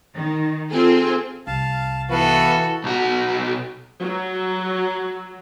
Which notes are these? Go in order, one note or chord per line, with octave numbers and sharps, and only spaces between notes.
D#3
C4 F4 G#4 A4
C2 F5 A5
E3 B3 F#4 A4 B4 F5
B1 F#4
F#3